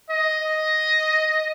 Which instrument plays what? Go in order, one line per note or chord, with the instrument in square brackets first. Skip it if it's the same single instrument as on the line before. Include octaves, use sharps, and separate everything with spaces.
[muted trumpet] D#5